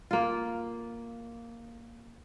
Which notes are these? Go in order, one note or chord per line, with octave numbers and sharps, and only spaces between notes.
A#3 F4